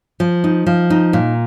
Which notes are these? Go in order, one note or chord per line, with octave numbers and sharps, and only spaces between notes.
F3
D#4
F3
D#4
A#2